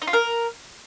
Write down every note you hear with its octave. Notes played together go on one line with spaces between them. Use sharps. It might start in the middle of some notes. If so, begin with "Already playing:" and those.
D#4
F4
A#4